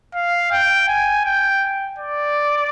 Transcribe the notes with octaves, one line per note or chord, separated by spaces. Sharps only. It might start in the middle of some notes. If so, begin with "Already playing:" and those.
F5
G5
G#5
G5
D5